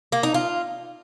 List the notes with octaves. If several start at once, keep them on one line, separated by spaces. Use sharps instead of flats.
A#3
D#4
F4